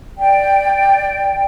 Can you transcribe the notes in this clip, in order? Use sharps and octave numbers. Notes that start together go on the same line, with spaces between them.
D5 G5